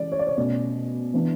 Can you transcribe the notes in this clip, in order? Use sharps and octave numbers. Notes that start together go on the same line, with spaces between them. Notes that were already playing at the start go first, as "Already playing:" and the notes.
Already playing: E3 G#3 C#4 D5
C#5
D5
C#5
B2 A3 C#4 D5
E3 B3 D4